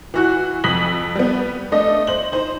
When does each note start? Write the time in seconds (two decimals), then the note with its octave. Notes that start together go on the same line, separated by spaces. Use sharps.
0.14 E3 F#4 F#6
0.64 F2 D#6 B6 F#7
1.15 G3 B3
1.72 A3 D4 D#5
2.07 C5 F#7
2.32 D#4 C5